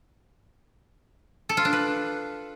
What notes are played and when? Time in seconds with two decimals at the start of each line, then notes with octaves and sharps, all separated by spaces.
1.49 A4
1.57 F4
1.65 D4
1.73 B4